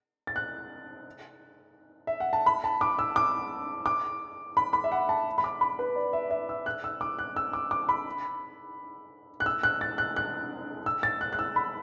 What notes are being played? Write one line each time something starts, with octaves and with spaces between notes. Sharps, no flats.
A6
F#6
E5
F#5
A5
B5
A5
D6
E6
D6
D6
B5
B5
E5
F#5
A5
B5
D6
B5
B4
D5
E5
E5
E6
F#6
E6
D6
F#6
E6
D6
D6
B5
F#6
E6
F#6
A6
F#6
F#6
E6
A6
F#6
F#6
E6
B5